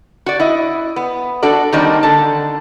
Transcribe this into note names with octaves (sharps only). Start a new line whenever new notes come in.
F#4 D5
E4 D#5
B3
D4 F#4 A4 D5
D#3 G3 A#3 C4 D4 D#4
D3 A5